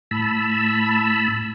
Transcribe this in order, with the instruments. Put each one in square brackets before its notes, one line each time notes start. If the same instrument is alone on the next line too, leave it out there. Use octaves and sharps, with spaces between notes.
[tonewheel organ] A2 A5 B5 E6